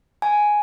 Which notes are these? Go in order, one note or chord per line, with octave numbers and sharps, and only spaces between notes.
G#5